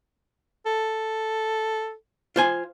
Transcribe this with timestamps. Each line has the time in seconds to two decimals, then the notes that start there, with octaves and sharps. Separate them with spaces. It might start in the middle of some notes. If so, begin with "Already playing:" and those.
0.66 A4
2.36 F4 C5 G#5